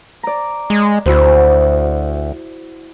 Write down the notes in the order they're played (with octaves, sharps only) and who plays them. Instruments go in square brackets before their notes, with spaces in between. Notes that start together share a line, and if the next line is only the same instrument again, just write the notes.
[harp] D5 A#5
[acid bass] G#3
[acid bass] D2 [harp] E4 F#4 C5